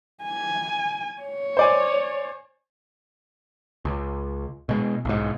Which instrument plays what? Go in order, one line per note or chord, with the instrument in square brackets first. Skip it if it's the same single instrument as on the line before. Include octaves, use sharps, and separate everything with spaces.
[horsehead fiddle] G#5
C#5
[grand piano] C5 D5 G#5
[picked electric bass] C#2
B2 G#3
B1 G#2